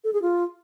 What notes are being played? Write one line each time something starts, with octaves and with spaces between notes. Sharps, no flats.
A4
G#4
F4